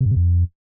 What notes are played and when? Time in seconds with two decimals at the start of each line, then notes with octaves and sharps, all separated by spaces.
0.01 C3
0.06 G2
0.11 C3
0.16 F2